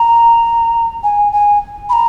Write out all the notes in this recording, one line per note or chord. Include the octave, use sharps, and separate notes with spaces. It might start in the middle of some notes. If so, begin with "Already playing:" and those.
Already playing: A#5
G#5
G#5
B5
A#5